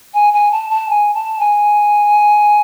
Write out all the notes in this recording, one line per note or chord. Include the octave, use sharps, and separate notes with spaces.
G#5
G#5
A5
A5
G#5
A5
G#5